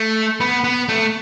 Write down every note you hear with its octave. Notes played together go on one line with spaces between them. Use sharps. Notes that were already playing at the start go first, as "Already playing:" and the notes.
Already playing: A3
B3
B3
A3